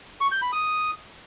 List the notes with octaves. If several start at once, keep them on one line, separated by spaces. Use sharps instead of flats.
C#6
G6
B5
D#6